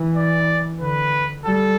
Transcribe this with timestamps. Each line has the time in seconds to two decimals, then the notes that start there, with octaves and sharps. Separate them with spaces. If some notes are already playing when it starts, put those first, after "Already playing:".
Already playing: E3
0.16 D5
0.81 D3 B4
1.45 G3 A4